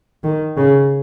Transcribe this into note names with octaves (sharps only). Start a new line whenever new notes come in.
D#3
C#3